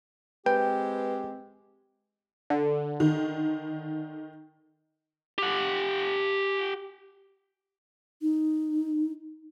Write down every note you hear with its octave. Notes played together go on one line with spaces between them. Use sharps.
G#3 C4 G4 B4 G5
D3
D#3
G4 F#5
D#4